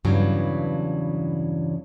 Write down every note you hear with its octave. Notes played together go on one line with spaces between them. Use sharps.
E2 G2 C#3 E3 F#3